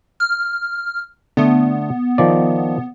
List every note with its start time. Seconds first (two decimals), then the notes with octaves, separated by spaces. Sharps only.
0.20 F6
1.37 D3 A3 B3
2.18 D#3 F3 D5